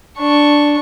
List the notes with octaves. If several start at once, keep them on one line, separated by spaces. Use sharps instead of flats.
D4 C#6